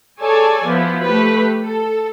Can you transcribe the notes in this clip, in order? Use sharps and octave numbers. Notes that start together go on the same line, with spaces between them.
G#4 A4 C#5 D5 G#5 A5
F3 B3 E4
A3 G4 B4
A4